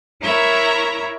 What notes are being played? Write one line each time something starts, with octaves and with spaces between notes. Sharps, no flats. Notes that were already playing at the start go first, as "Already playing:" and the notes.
E4 A#4 C#5 E5 A#5